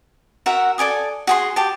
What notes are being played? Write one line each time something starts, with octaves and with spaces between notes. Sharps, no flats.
F#4 A#4 E5 F#5
A4 D5 G#5 D#6
F#4 G#4 C6
G4 A5